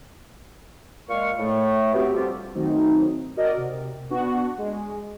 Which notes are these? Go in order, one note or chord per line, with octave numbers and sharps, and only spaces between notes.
A#2 G#3 F5 C#6
A2 A3
B3 C4 F#4 G4
D3 F3 G3 F4 G4
D#3 F#3 A3 C4 D#4
F#4 A#4 D5 D#5
C3
B3 D4 F#4
G#3